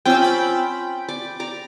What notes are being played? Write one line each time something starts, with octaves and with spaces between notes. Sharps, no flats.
C4 C#4 F4 G5 D6 E6
G5 B5
D5
D5 A#5